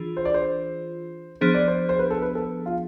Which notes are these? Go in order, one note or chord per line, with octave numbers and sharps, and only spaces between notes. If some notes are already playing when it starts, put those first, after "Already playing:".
Already playing: E3 D4 F4 G#4
C5
D5
C5
F3 B3 D4 G#4 C5
D5
C5
C5
B4
A4
B4
A4
F4